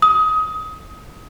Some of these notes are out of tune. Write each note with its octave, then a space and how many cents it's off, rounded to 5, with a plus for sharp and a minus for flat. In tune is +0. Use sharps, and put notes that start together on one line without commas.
D#6 +20